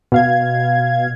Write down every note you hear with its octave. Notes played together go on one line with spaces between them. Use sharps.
B2 F5 G#6